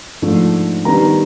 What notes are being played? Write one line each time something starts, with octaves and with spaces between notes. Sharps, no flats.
G#2 F3 A3 D4
D#3 G3 B3 D4 A#5